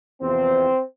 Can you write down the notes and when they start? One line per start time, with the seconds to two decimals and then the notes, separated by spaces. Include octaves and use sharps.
0.22 E2 C3 F3 C4